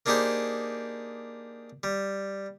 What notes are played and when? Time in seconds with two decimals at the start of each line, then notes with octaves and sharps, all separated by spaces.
0.06 A#3 D4 D#4 G4 G#4 C5
1.83 G3